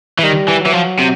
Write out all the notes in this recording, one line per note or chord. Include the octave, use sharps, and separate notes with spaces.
E3
D#3 G3
E3
F#3
E3
F3
C3